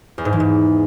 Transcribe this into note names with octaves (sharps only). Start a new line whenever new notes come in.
E2
G#2
E3
G#2